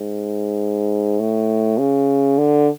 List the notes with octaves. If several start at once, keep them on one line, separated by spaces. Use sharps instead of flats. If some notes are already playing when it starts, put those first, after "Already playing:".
Already playing: G#2
A2
C#3
D3